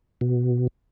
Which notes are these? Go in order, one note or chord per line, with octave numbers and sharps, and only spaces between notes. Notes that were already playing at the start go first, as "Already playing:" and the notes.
B2